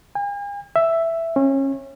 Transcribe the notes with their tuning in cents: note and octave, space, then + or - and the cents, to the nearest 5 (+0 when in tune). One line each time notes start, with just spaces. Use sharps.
G#5 -45
E5 +5
C#4 -30